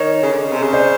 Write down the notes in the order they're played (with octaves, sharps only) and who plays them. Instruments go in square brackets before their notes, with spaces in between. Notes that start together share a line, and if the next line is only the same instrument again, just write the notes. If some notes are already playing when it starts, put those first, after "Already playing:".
Already playing: [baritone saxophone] D#3 [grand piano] C#5 D#5
[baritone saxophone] C#3
D3
C#3
C3
C#3
[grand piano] C5 D5